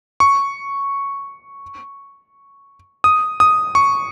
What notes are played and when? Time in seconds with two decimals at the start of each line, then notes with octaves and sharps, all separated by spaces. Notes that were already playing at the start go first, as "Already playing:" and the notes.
0.20 C#6
3.04 D#6
3.40 D#6
3.75 C#6